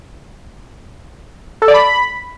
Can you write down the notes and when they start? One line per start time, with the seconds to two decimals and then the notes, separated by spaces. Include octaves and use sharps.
1.62 A4
1.68 D5
1.74 B5